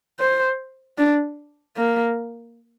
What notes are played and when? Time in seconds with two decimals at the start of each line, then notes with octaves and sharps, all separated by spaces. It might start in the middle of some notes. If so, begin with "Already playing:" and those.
0.20 C5
0.98 D4
1.77 A#3